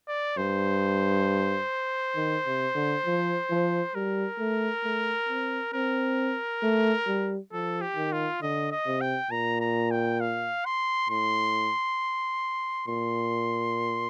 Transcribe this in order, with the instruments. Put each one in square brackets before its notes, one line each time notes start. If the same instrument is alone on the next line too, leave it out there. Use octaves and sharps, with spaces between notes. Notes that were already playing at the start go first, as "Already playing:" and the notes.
[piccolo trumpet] D5
[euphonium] G2 [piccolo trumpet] C5
[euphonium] D#3
C3
D3
F3
F3
[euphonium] G3 [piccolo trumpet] A#4
[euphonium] A3
A3
C4
[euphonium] C4 [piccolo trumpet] A#4
[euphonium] A3
G3
[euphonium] F3 [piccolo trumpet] A4
[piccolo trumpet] G4
[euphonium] D#3
[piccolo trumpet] F4
[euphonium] D3 [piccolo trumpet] D#5
[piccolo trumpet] D#5
[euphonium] C3
[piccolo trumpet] G5
[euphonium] A#2 [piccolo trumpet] A#5
[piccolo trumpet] A#5
G5
F5
C6
[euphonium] A2 [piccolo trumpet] C6
[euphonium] A#2 [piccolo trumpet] C6